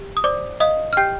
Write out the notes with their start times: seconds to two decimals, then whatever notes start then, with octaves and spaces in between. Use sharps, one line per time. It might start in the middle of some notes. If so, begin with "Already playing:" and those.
Already playing: G4
0.17 D#6
0.24 C5 D5 D6
0.60 D#5 F5 D#6
0.93 F6
0.97 G4 G5 G6